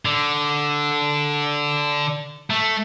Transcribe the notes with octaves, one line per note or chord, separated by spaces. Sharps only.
D3
A3